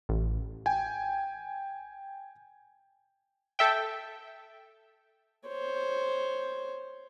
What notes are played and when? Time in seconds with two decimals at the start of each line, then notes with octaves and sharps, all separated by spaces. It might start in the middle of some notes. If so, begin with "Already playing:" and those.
0.09 A1
0.66 G5 G#5
3.59 A4 E5 G5
5.48 C5 C#5